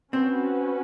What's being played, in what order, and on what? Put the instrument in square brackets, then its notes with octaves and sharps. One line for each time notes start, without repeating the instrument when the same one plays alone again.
[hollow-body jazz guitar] C4 [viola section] C#4 F#4 B4